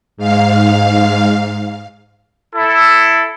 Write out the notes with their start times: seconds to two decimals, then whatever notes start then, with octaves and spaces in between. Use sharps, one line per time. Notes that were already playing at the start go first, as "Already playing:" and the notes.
0.17 G#2 F5
2.55 E4 A4